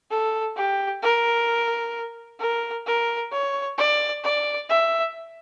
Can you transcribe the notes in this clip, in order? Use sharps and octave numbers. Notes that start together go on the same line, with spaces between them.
A4
G4
A#4
A#4
A#4
C#5
D5
D5
E5